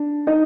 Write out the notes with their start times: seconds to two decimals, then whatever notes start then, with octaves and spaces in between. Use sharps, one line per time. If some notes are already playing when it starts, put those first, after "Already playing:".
Already playing: D4
0.27 D#4 D#5